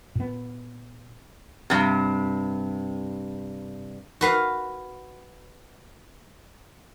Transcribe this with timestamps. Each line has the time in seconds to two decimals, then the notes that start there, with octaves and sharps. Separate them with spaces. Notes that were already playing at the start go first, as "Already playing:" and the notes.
0.15 A#2 B3
1.70 G2 C3
4.21 F#4 B4 F5